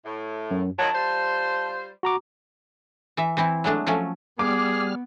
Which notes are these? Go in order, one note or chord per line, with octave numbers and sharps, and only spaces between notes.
A2
F#2
D#3 F3 F#3 A5
G3 F4 C5
F#4 A#5 D6
E3 E5
E3 C4 E4
F#3 G#3 A3 D4
F3 F#3 A3 C#4
G3 B3 G#4 D6 F6